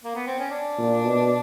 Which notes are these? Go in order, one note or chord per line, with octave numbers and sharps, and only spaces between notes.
A#3
B3
C4
C#4
D4
A#2
B2